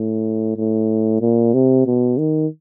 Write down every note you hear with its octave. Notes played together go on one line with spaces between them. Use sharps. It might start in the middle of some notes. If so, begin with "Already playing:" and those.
Already playing: A2
A2
A#2
C3
B2
D#3